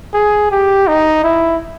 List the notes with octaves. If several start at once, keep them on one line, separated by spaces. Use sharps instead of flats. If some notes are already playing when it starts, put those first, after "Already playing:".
G#4
G4
D#4
E4